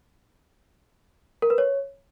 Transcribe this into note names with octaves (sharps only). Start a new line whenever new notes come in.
A#4
B4
C#5